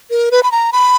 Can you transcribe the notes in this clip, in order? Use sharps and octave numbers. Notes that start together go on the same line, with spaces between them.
A#4
B4
B5
A#5
B5